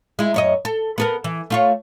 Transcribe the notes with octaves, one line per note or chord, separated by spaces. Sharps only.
G#3 E4
F#2 C#5 D#5
A4
B3 A4 A#4
E3
A3 F4 C#5